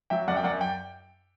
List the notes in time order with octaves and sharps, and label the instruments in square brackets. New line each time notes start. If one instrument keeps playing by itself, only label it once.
[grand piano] F#3 E5 G5
F#2 D5 F#5
G5
F#2 D5 F#5
G5